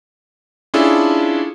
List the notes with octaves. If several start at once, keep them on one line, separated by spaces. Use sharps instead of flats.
C#4 D4 E4 F4 G#4 A4